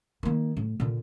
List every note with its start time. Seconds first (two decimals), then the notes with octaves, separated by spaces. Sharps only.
0.23 D#3 A#3
0.57 A2
0.80 A#2 D3